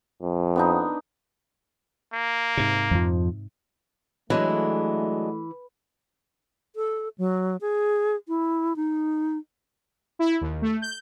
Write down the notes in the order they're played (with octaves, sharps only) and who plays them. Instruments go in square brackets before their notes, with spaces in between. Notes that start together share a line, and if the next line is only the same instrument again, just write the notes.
[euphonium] F2
[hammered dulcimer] B3 D4 D#4
[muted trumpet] A#3
[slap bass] G#2 C3
[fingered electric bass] F2 F3
[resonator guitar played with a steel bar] E3 [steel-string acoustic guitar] F#3 G#3 D4 [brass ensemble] A3
[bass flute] A4
F#3
G#4
E4
D#4
[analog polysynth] E4
D#2
A3
G6